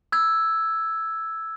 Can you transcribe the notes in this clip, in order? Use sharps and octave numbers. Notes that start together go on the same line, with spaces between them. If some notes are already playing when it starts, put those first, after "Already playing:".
E6 G#6